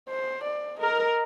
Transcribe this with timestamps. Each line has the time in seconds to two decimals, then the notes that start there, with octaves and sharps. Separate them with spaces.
0.09 C5
0.44 D5
0.79 A#4 D#5